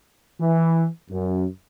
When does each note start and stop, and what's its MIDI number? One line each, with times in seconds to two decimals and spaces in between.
0.39 0.87 52
1.10 1.45 42